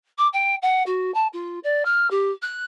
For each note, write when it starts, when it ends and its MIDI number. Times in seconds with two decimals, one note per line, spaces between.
0.18 0.27 86
0.33 0.55 79
0.62 0.82 78
0.86 1.13 66
1.14 1.27 81
1.33 1.59 65
1.63 1.83 74
1.85 2.09 89
2.10 2.31 67
2.42 2.65 90